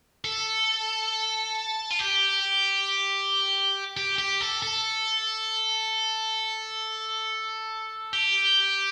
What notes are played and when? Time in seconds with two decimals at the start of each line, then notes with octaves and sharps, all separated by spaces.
0.25 A4
1.91 F4
1.99 G4
3.97 G4
4.18 G4
4.41 A4
4.62 A4
8.13 G4